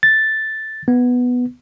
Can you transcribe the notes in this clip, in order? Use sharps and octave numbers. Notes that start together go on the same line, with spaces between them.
A6
B3